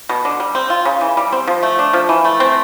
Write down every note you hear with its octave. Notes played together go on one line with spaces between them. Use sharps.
B2
D3
G3
C4
F4
C#3
E3
G3
C4
F3
A3
D4
F3
E3
A3
C4